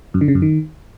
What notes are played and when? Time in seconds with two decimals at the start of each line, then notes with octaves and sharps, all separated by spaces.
0.14 F#2
0.21 D3
0.28 C#3
0.35 F#2
0.42 D#3